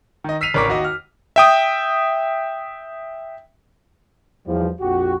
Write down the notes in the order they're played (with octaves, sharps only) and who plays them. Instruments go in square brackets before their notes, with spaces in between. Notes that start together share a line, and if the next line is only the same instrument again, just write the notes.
[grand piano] D#3 D#5
E6 B6 C7 D#7 F7
A1 D4 A#4 C#6 D6 B6
D#2 F#4 D#5
F6
[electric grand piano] E5 G5 D#6
[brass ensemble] B1 G3 [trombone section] E2 F3
[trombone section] A#1 F2 G4 [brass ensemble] F#4